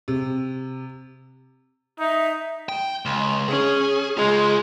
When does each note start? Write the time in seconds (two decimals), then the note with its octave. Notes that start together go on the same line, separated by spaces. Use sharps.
0.08 C3
1.99 D#4 E5
2.69 G5
3.05 C#2
3.48 C#4 G#4
4.17 C#3 G#3 F4